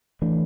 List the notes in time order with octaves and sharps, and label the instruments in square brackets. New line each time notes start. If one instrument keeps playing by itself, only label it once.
[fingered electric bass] E3 A3 D4